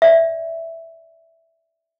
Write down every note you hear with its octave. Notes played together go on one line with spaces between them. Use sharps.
D5 E5